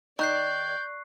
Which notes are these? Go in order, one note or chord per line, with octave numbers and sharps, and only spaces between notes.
D#3 D5 C#6 F#6 G6 C7